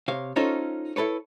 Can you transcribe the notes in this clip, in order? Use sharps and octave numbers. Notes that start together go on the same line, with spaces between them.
C3 C#5 F5
C#4 D#4 F4 A4 C5 C#5
E4 A4 B4 C#5